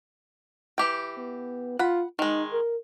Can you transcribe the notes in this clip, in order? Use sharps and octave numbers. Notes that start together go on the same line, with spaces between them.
E3 G4 G5
B3
F4 F#5 B5
D#3 G#3 D#4
A#4